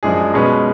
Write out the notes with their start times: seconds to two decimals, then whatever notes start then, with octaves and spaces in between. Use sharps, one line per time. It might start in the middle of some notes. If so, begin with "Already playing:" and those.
0.03 F#2 F3 G#3 D4 G#4
0.34 B2 G#3 C#4 F#4 B4